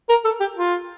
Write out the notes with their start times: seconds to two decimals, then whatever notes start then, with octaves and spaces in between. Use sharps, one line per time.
0.09 A#4
0.24 A4
0.40 G4
0.56 F4